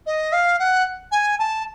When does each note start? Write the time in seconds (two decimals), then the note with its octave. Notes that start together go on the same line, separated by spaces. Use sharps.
0.06 D#5
0.32 F5
0.59 F#5
1.11 G#5
1.39 A5